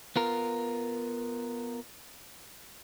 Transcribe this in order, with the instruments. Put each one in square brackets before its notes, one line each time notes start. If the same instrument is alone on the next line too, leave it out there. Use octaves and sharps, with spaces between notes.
[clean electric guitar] B3 F4 A#4